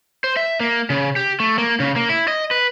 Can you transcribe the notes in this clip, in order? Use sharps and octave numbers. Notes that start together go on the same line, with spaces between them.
C5
E5
A#3
C#3
G4
A3
A#3
C#3
A#3
E4
D#5
B4